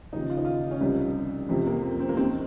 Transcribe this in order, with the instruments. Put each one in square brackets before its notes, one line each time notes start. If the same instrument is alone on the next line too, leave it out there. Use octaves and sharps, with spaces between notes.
[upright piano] D#2 C#3 F3 D#4
F4
D#4
F4
C#4
C2 C3 F3 D#4
F2 C3 F3 C4
A#3
C4
C4
A#3
D#2 D#3 C4